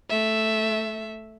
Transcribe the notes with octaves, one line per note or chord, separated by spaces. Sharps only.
A3 E5